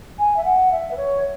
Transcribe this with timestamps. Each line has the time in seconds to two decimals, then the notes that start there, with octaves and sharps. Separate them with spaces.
0.19 G#5
0.37 E5
0.45 F#5
0.71 E5
0.91 B4
0.97 C#5